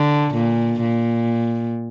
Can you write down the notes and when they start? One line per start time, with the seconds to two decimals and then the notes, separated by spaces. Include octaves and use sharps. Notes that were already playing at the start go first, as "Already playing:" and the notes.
Already playing: D3
0.35 A#2
0.82 A#2